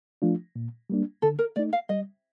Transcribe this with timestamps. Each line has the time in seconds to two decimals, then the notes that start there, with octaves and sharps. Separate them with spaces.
0.22 F3 A3 D4 F4
0.56 A#2
0.90 G3 A#3 D4
1.22 D3 A4
1.39 A#4
1.56 A3 D#4 D5
1.73 F5
1.89 G3 D#5